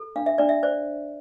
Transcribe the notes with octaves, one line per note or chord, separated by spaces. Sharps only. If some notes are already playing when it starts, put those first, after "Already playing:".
Already playing: A4
D4 F5
E5
D4 D5
E5
C5 D5